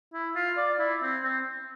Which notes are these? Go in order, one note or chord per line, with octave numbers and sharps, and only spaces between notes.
E4
F4
D5
E4
C4
C4